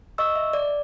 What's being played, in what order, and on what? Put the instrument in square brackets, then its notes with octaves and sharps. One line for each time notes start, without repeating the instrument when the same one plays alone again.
[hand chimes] D#5 C#6 E6
E5
D5